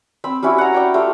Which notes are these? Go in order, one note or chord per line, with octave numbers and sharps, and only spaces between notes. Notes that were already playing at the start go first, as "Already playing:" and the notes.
C4 B5 E6
G3 C#4 E4 F#4
F#5 A#5
D5 G5 C#6
G3 A3 F4